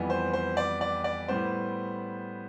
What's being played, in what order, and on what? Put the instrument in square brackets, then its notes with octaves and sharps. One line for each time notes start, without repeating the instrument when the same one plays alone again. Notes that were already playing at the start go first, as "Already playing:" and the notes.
Already playing: [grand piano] F2 E3 G3 B3
C5
C5
D5
D5
D5
A2 G3 B3 C5